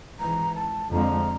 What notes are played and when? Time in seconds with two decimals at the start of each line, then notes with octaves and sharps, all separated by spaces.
0.19 G#1 G#2 E3 A#5
0.56 A5
0.91 F2 D3 F3 G#3 C4 A#5